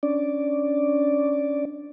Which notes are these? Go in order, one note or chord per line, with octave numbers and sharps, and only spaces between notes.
C#4 D4 D5